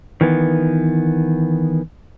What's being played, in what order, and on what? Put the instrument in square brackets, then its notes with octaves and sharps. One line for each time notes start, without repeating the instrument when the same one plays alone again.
[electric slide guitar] D#3 E3 B3